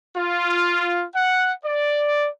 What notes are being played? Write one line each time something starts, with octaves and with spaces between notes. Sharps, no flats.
F4
F#5
D5